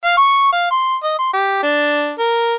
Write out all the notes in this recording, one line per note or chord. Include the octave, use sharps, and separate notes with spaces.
F5
C#6
F5
C6
D#5
C6
G4
D4
A#4